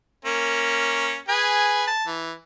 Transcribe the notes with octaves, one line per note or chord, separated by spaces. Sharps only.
A#3 C#4
G#4 B4 G#5
A5
E3